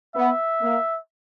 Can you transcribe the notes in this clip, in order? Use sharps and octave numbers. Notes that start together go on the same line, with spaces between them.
B3 E5
A#3